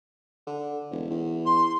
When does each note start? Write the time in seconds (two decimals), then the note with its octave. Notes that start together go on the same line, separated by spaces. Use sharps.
0.47 D3
0.91 E1
1.10 E2
1.45 C6